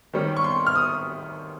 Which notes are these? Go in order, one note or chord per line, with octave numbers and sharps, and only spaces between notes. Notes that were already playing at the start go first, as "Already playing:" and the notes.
D#3 G3 C#4
C#6
C6
F6
D#6